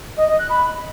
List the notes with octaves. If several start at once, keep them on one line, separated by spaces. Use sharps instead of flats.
D#5
D#5
F#6
B5